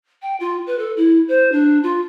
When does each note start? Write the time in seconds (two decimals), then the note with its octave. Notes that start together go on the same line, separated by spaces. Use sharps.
0.22 G5
0.40 F4
0.66 B4
0.78 A4
0.96 E4
1.28 C5
1.52 D4
1.83 F4